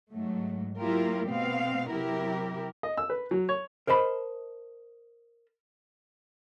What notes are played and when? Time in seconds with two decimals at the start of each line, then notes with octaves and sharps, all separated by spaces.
0.11 G#2 F#3 A3
0.78 F#3 A#3 E4 F4 G4 A#4
1.27 B2 A3 B3 C4 F5
1.91 C3 F#3 E4 G4 A#4
2.83 D#5
2.97 E6
3.10 B4
3.31 F#3
3.49 C#5
3.87 A#4 C5 D#5 A5 B5